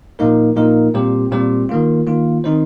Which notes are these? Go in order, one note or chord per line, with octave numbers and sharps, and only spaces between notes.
A#2 F3 A#3 D#4 A#4
A#2 F3 A#3 D#4 A#4
A#2 G3 C4 G4 C5
A#2 G3 C4 G4 C5
D#3 A#3 F4
D#3 A#3 F4
D#3 C4 D#4 C5